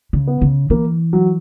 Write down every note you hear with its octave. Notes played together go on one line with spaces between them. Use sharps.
C#3
B3
C#3
E3 A#3
F#3